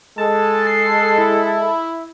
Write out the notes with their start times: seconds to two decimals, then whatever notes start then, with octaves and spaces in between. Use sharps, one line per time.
0.18 G#3 A4 A5
0.67 C7
1.18 E4